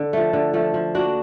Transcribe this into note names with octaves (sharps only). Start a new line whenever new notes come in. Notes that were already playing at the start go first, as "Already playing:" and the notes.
Already playing: D3
F3 A3
D3
F3 A3
F3
A#3 D4 F#4